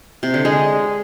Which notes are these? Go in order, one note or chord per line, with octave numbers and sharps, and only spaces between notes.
C3
D3
G#3